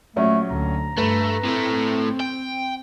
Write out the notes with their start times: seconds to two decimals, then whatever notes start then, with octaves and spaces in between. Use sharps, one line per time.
0.16 A#1 F#3 A3 C#4
0.50 D2 A#5
0.98 G2 A3 B4
1.45 A2 A3 C4
2.20 G5